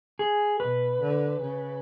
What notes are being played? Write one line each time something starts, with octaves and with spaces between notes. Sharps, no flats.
G#4
B2 B4
D3
C#3